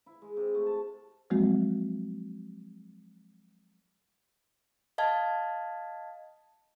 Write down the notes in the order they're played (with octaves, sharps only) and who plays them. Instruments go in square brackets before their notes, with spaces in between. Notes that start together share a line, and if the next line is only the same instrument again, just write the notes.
[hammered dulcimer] E4
G#3
C3
A3
A5
[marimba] F3 F#3 G#3 A#3 C4 F#4
[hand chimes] D#5 F5 A5 G#6